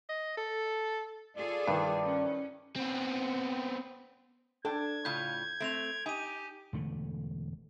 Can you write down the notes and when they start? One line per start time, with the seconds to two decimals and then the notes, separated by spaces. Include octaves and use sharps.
0.09 D#5
0.37 A4
1.37 F4 G#4 A4 D5
1.68 G2 D#3 E4 B4
2.05 C#4
2.76 B3 C4
4.65 D4 A4 G5 G#6
5.05 A2 C#3 F4 G6
5.60 A3 C4 D7 F7
6.06 D#4 G4 G#5 D#7
6.73 E1 D3 A3